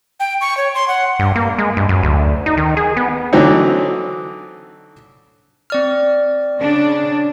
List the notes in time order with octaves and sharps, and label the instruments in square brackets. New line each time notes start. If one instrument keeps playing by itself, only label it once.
[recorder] G5
C#6
C#5
C6
F#5
[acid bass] G2
A#3
G#3
G2
F#2
D2
D#4
D#3
G#4
B3
[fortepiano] D3 E3 F#3 C4 D#4
[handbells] C4 D5 F6
[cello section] C#3 D4